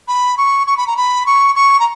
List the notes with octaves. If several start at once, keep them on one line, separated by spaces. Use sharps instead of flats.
B5
C#6
C#6
B5
A#5
B5
C#6
C#6
A#5